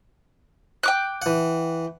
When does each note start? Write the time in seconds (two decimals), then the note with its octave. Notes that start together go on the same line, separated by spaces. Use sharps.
0.83 G5 D6 F#6
1.22 E3 F#5